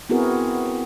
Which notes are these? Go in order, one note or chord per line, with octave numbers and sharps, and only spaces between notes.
B3 C4 E4 F#4 G#4 A#4